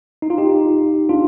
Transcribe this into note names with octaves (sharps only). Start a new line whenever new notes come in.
D#4
F4
D#4 G4
D4 F4